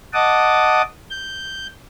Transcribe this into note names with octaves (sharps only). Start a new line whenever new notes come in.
D#5 F#5 A5 D6 D#6
G6